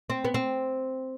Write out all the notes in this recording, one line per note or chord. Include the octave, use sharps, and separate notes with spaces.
C4
B3
C4